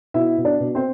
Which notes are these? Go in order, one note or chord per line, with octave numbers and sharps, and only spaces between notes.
B2 E4 E5
B2
D4 D5
B2
C4 C5